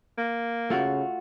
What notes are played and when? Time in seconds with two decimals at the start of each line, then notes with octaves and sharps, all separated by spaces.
0.18 A#3
0.70 C#3 A3 F4 F#4